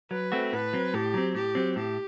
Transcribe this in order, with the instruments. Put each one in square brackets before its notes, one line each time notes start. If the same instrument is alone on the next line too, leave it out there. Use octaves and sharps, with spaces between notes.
[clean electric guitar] F#3 [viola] B4
[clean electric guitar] A3 C4 F#4
[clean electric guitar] A2 [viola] B4
[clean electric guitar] F#3 C4
[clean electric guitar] A2 [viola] G4
[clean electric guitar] F#3 C4
[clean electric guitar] A2 [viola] G4
[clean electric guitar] F#3 C4
[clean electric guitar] A2 [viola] G4